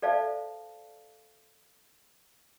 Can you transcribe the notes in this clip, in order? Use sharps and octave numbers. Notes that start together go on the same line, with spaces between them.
A4 C5 D5 E5 F5 A5